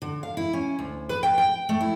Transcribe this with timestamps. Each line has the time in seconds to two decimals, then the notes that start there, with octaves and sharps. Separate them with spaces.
0.02 D3
0.23 F5
0.37 E4
0.53 C#4
0.79 D2
1.09 B4
1.23 G5
1.38 G5
1.69 A3
1.81 E4